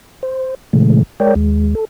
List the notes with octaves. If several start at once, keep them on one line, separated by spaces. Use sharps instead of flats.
C5
A#2 C#3 E3 G#3 A3
G#3 A#4 C#5 D5 G5
D#2 G#3
A4